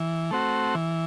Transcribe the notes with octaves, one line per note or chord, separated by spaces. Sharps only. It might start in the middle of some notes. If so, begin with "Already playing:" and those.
Already playing: E3
A3 C4 F#4
E3